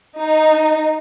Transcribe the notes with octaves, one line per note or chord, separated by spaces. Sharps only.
D#4